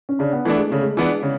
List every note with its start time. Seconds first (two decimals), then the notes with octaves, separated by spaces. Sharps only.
0.09 C#4
0.19 C#3 D4
0.33 B3
0.45 E3 A3 B3 D4
0.58 G#3
0.70 C#3 A3
0.82 G#3
0.97 E3 B3 D4
1.23 C#3